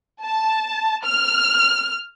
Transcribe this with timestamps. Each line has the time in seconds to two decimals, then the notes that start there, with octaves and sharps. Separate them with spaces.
0.23 A5
1.03 F6